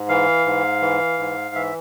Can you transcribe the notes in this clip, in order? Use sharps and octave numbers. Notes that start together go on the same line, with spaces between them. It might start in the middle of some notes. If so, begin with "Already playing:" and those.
Already playing: G#2
E3 F5
G#2
E3
G#2
E3 E5